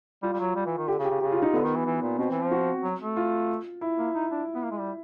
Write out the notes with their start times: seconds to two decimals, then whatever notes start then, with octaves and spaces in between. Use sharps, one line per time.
0.23 G3 F4
0.33 G3
0.40 F#3
0.55 G3
0.66 E3
0.77 D#3
0.88 D3 G4
0.99 C#3
1.05 G4
1.10 C#3
1.20 C#3 G4
1.32 F4
1.42 D#4
1.53 D3 B3
1.64 D#3
1.75 E3
1.86 E3
2.02 A#2
2.18 B2 C4
2.30 E3
2.40 F3
2.51 F#4
2.83 F#3
3.00 A3
3.17 F4
3.81 E4
3.98 A#3
4.14 D#4
4.31 D4
4.55 B3
4.63 A#3
4.71 G#3
4.80 G3